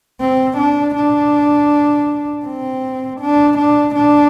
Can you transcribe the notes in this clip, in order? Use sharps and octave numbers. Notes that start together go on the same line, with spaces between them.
C4
D4
D4
C4
D4
D4
D4